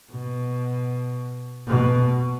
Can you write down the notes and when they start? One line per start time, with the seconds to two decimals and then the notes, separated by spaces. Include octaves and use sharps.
0.11 B2
1.67 B2